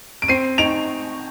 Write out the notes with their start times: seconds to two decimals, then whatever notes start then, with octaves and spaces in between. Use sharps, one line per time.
0.22 D7
0.28 C4 C7 D#7
0.58 D#4 D7 F7